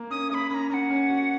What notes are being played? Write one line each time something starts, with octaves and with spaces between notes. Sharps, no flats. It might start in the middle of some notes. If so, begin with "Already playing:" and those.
Already playing: A#3
C#4 D#6
A#3 B5 D#6
C#4 A#5 B5
C#4 F#5 A#5
C#4
F#4